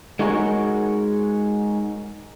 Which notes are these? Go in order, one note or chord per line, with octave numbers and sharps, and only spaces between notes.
G#3 D#4 F#4 G#4 A#4 C#5